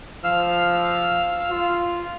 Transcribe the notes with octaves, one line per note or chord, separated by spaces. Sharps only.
F3 F5 E6 F6
F4